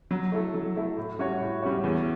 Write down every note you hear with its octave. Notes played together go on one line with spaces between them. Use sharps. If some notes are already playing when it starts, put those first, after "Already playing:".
F#3
A3 E4 A4
F#3
A3 E4 A4
A2
G3 C#4 F#4 C#5
A2
G3 C#4 F#4 C#5
E2